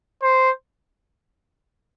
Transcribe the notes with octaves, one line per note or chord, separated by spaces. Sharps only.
C5